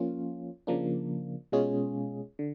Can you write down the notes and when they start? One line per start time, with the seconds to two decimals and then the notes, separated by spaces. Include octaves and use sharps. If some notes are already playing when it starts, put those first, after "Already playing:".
Already playing: F3 A#3 C#4 F4
0.67 C#3 F3 A#3 D4
1.52 B2 G#3 C#4 F4 G#4
2.39 D3